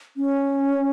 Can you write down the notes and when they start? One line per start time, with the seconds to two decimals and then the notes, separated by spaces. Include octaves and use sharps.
0.17 C#4